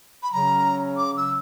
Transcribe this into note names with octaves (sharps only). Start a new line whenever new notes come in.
B5
C#3 F#3 C#4 A#5
D6
E6